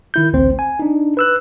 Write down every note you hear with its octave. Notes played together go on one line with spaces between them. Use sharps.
D#3 E4 G6
A1 D2 C4 C5
G#5
D4 D#4
B4 E6 F#6